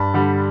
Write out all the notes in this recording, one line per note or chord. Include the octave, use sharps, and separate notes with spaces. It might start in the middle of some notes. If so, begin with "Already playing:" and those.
Already playing: G2 A5 B5
D3 G3